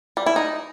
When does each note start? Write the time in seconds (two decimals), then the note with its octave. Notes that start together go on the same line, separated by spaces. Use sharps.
0.17 G3
0.26 E4
0.36 D#4